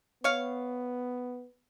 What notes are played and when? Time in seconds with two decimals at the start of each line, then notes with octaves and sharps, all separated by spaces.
0.24 B3 C#5 F5